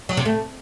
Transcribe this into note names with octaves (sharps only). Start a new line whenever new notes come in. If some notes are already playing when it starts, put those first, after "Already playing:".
F#3
C3
A3